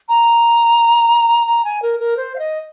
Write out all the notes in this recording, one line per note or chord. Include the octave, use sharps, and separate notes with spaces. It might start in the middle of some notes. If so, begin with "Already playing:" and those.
A#5
A#5
G#5
A#4
A#4
C5
F5
D#5